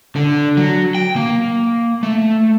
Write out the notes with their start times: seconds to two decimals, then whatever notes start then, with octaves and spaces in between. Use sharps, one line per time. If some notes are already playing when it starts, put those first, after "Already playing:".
0.16 D3
0.57 F#3
0.95 G5
1.16 A#3
2.03 A3